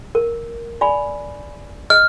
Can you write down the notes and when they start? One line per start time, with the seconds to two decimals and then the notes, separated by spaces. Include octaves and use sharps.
0.15 A#4
0.81 D5 G#5 B5
1.90 D#5 F6